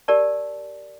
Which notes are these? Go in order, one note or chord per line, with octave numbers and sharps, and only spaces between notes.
G4 A#4 D5 A5